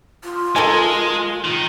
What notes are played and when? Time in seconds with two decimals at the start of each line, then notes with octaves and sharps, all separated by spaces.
0.24 F4
0.56 G#3 A4 A#4 G#5
1.45 D#3